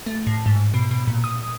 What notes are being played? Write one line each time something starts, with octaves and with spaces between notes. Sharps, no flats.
A3
A2
G#2
B2
B2
A#2
D#6